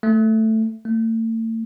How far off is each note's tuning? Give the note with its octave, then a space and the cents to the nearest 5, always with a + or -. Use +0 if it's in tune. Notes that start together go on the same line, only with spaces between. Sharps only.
A3 +5
A3 +40